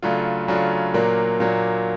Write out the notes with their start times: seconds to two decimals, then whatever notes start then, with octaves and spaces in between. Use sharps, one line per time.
0.03 C#3 F#3 A3 D4 F4
0.48 C#3 F#3 A3 D4 F4
0.94 A#2 F#3 A#3 D4
1.40 A#2 F#3 A#3 D4